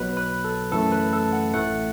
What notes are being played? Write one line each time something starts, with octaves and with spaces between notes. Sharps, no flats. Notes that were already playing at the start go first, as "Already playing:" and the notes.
Already playing: B1 B2 F#3 B4
B4
A4
F#2 E3 A3 A4
B4
A4
F#5
A1 A2 A3 F#5